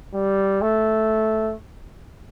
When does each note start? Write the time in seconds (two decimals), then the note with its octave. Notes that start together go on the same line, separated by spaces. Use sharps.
0.14 G3
0.61 A3